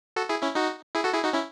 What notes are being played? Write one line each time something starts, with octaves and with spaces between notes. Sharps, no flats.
F#4 A4
E4 G#4
C#4 E4
D#4 F#4
E4 G#4
F#4 A4
E4 G#4
D#4 F#4
C#4 E4